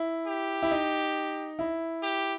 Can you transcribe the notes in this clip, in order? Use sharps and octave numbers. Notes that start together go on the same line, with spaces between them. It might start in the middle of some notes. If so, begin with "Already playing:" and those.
Already playing: E4
G4
E4
D#4
E4
G4